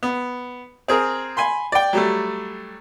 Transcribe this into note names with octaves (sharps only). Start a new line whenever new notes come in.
B3
C4 G#4 A#4
G#5 B5 C6
D5 G5
F#3 G3 A3